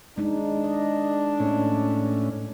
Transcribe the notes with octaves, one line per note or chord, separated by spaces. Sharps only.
G#3 D4 D#4
D#5
A2 C#4